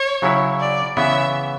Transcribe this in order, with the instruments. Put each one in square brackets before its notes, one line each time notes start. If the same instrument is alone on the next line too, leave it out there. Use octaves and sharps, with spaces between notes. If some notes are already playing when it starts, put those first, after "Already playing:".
Already playing: [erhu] C#5
[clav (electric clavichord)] C#3 F#3 C#4 E4
[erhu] D5
[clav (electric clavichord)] C#3 E3 B3 [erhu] E5